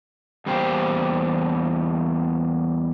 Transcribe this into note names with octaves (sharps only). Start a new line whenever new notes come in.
E2 G3 A#3 G4 C5